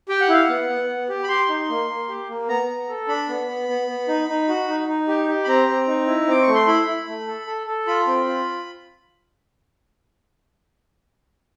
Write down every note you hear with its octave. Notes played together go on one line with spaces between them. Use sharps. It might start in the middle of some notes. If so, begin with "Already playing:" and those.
G4 G5
F#5
E4 F5
F#5
B3
B3
B3
G4
B5
G4 C6
D#4
A#3
A#3
G4
A#3
B3 A#5
B3
A4
D4 B5
B3
B3
B3
B3
D#4
D#4
F#4
D#4
D#4
G4
G4
B5
C4 A#5
C4
D#4
E4
C4 D6
A3 C#6
C6
E4 B5
E4
A3
A4
A4
A4
F4 B5
C4
F4